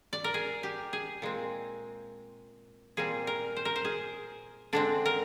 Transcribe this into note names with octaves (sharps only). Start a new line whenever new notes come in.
D5
A#4
G#4
G4
G#4
A#2 G#3 C4
A#2 G3 C4 G#4
A#4
C5
A#4
C5
G#4
D3 G#3 C4 D4
A#4